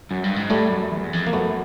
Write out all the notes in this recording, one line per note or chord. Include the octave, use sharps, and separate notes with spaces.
F#2
G2
G#2
A2 G3 A3
F#2
E2
F2
A#3
F#2 A3 B3